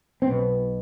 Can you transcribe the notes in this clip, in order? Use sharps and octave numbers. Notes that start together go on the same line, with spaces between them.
C4
B1 B2 B3